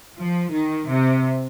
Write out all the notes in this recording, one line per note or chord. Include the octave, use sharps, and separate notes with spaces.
F3
D#3
C3